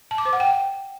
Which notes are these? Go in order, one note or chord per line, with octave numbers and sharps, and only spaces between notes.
A5
D6
C5
F#5
G5